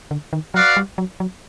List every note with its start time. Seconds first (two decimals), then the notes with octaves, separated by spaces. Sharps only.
0.11 D3
0.33 D#3
0.54 F#3 F#4 B4 D5 F5
0.77 G3
0.98 F#3
1.20 F#3